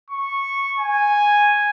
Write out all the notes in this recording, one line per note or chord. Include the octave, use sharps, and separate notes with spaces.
C#6
G#5